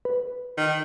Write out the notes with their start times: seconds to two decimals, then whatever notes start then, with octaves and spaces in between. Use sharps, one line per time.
0.05 B4
0.57 D#3